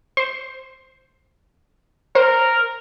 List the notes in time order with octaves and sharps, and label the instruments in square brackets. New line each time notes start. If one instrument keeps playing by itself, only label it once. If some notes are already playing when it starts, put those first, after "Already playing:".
[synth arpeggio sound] C5
[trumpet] A#4 [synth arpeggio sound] C5